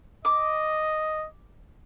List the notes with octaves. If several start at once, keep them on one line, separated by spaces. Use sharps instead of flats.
D#5 D6